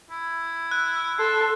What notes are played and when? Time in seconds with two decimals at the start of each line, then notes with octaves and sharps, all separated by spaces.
0.10 E4
0.71 F#6
1.19 A4 C6